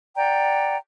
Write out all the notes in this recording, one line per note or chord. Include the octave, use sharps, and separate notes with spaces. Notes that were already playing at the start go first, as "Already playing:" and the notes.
D5 F#5 G5 A#5